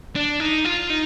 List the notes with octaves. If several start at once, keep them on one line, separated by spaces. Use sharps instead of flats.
D4
D#4
F4
D#4